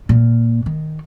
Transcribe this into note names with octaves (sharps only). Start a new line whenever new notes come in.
A#2
D#3